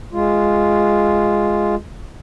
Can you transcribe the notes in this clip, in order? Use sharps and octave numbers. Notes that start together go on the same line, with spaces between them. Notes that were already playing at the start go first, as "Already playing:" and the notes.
G#3 F4